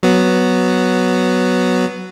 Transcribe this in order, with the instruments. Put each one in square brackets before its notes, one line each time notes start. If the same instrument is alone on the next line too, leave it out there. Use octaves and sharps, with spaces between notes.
[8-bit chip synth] F#3 B3